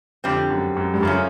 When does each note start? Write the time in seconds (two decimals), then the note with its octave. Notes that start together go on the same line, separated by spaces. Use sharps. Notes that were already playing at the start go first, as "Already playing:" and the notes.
0.24 F2 D3 G3 C4
0.50 F#2
0.77 F#2
0.94 G2
1.03 F#2 C#3 F3 A3 C#4